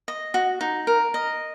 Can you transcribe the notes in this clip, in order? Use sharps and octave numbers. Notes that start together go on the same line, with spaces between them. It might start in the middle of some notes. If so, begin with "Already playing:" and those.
D#5
F#4
D#4
A#4
D#5